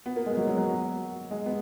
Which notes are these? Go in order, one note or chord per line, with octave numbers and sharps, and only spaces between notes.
B3
A#3
G#3
F#3
F#3
F#3
G#3
B3